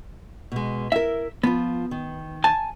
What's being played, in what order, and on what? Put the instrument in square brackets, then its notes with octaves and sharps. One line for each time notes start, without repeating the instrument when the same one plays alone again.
[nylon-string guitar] B2 G#3
[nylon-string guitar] E4 A#4 [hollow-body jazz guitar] E5
[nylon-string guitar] F3 F4 [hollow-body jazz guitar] B3
[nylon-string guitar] D#3
[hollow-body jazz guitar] G#5 A5